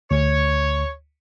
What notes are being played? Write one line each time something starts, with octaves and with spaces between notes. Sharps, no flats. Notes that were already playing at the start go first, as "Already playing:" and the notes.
D2 C#5